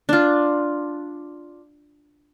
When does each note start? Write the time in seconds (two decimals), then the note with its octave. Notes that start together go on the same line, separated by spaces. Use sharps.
0.09 D4 F4